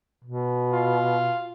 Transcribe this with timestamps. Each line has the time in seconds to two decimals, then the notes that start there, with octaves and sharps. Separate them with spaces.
0.24 B2
0.73 F4